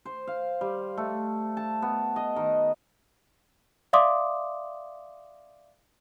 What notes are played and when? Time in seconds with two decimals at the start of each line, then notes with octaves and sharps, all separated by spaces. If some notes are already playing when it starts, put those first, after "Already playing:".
0.05 C5
0.27 F5
0.61 G3
0.97 A3
1.57 A5
1.82 B3
2.16 D#5
2.36 D#3
3.93 D5 E5 F5 C6 D6 D#6